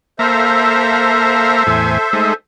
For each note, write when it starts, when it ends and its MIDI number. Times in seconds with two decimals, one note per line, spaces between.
0.19 1.63 58
0.19 2.34 69
0.19 2.34 72
0.19 2.34 76
0.19 1.63 77
0.19 1.63 82
1.67 1.98 40
1.67 1.98 45
1.67 1.98 80
2.13 2.34 56
2.13 2.34 57
2.13 2.34 63